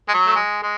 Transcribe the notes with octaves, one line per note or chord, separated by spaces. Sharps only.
G#3
F#3
A3
G#3
G#3